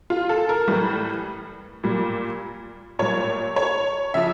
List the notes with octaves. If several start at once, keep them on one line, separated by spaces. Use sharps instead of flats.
F4
A4
A#4
A2 E3 G3
A#2 G3
A#2 G3 C#5
C#5
C#3 F3 E5